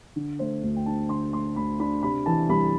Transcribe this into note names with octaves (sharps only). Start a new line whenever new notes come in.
D3
A3 C5
D2
G5
D4 A5
D3 C6
A3 C6
D2 B5
D4 B5
C3 B5
E3 A5
C2 B5